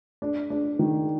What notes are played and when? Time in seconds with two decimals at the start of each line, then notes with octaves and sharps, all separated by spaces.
0.22 D4
0.50 D4
0.79 D#3